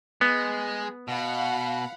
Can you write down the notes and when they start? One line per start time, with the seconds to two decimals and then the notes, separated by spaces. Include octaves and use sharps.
0.21 G#3 B3
1.08 B2 F5 F#5 B5